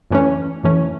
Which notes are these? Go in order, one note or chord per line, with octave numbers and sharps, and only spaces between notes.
F#2 E3 A3 C#4
F#2 E3 A3 C#4